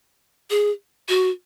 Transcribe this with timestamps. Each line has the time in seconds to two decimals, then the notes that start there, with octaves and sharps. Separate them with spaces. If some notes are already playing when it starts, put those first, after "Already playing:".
0.50 G#4
1.09 F#4